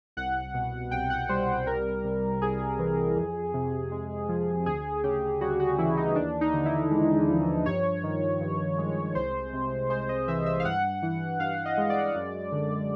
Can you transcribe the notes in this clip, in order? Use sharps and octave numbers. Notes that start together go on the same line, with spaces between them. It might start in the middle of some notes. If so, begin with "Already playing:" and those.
C2 F#5
B2
C2 G5
F#5
G3 C5
C2 A#4
C3
C2 G#4
E3
F2
C3
G#3
F3
D2 G#4
C#3 G4
G3 F#4
F#4
E3 E4
D#4
D#2 D4
D#4
D3
E4
G#3
F3
G2 C#5
D#3
G2
G#3
C2 C5
C3
G#3 C5
D#5
E3 E5
E5
F5
G2 F#5
E3
G2 F5
D#5
G#3
D5
F#2
D3